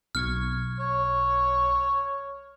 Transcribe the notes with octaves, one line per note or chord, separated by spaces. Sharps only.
B1 C#6 F6 G#6
C#5